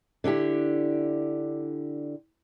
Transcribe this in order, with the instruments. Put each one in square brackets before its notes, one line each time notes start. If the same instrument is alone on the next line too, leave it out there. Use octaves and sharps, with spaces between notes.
[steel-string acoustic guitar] D3 D4 E4 G4